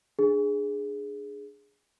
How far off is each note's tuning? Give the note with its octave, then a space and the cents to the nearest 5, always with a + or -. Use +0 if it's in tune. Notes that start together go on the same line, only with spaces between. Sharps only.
D4 +5 G#4 +0